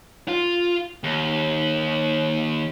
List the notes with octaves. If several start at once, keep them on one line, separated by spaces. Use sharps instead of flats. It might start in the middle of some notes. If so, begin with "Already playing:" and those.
F4
D#2